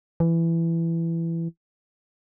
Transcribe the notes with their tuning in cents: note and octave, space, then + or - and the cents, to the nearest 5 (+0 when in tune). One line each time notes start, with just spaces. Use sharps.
E3 +15